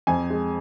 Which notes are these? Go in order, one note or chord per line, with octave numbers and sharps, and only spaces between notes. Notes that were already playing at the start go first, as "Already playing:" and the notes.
F2 G#5
G#3